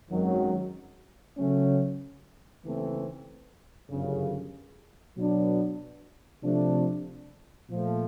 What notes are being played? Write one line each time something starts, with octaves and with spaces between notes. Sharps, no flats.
G#1 F#2 D#3 F#3
C#3 F#3 A3 C#4
D#2 C#3 E3 A3 C4
G1 F#2 C#3
B2 F#3 B3 D4
C3 F3 A3 D4
A#2 F3 A3